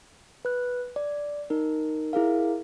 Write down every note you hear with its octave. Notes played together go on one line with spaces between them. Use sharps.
B4 F#6
D5
D#4 A#4
E4 G#4 A#4 F5